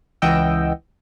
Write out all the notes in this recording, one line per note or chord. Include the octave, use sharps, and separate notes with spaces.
C#2 E3 D#5 F#5 G5 E6